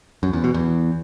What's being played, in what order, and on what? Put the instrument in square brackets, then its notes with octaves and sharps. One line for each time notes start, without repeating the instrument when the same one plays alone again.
[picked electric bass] F#2
E2
B2
E2